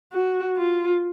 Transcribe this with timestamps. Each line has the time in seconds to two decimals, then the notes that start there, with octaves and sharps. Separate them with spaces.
0.13 F#4
0.57 F4